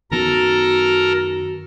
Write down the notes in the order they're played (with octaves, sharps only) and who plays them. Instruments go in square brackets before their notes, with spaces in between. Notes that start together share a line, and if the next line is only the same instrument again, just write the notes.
[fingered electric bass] F#2 D#3 B3 [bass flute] F#4 [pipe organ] A4 A#4 A#5